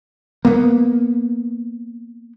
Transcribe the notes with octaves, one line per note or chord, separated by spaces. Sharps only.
A#3 B3